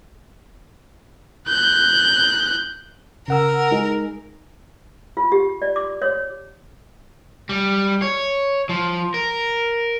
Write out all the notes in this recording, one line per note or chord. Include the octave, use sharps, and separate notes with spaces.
F#6 G6
C#3 A#4 F#5 E6
G#3 D#4 G#4
F4
G4
D5
D6
C#5
G3
C#5
F3
A#4